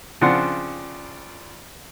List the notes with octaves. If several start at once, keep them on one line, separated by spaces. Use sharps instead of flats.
C#3 F3 C4 D4 F#5 C6